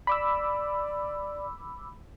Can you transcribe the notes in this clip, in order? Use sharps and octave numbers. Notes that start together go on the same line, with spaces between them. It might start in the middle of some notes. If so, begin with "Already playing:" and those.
D5 B5 D6 E6